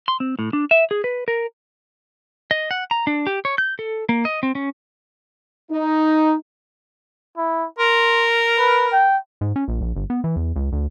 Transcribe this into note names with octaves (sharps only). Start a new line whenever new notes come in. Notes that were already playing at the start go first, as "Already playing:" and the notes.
C6
C4
A2
D4
E5
G#4
B4
A#4
D#5
F#5
A#5
D4
G4
C#5
G6
A4
A#3
D#5
C4
C#4
D#4
E4
A#4 C6
B4
G5
G#2
C#4
A#1
A#1
G1
B3
E3
E2
C#2
D2